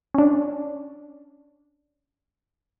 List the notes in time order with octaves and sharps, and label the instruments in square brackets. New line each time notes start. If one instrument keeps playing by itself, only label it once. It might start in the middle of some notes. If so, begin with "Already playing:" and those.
[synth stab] C#4 D4